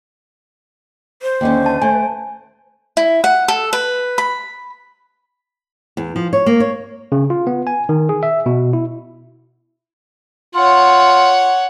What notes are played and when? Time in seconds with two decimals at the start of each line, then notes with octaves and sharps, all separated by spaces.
1.22 C5
1.41 D#2 D3 C#4
1.66 A5
1.82 A3 G#5
2.97 E4
3.24 F#5
3.48 A4
3.73 B4
4.18 B5
5.97 E2
6.16 F3
6.33 C#5
6.46 A#3
6.60 C#5
7.12 C#3
7.30 F4
7.47 B3
7.67 G#5
7.89 D#3
8.09 G#4
8.23 E5
8.46 B2
8.73 E4
10.55 F4 C#5 F#5